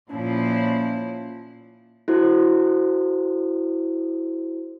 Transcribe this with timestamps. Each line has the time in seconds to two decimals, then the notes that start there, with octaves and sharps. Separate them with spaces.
0.11 A#2 F3 C#4 E4
2.08 E4 F#4 A4 C5